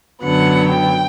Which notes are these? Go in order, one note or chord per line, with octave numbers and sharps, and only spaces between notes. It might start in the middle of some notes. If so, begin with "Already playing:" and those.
F#2 D3 F#3 B3 F#5
G5